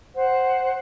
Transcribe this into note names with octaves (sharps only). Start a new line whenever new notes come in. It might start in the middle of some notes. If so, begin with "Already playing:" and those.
C5 F#5